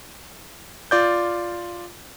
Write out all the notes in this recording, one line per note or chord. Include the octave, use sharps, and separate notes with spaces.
F4 D5 G6